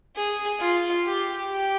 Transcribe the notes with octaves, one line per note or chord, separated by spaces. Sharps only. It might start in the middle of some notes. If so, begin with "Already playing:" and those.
G#4
F4
G4
G4